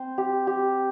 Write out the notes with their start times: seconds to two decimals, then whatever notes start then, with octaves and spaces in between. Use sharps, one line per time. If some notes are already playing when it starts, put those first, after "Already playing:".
Already playing: C4 C5
0.18 G4
0.47 G4